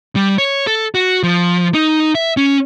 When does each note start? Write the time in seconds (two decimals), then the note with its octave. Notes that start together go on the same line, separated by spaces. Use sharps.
0.16 G3
0.38 C#5
0.67 A4
0.95 F#4
1.23 F3
1.74 D#4
2.15 E5
2.37 C#4